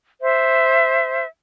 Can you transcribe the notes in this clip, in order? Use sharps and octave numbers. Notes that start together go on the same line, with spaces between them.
C5 E5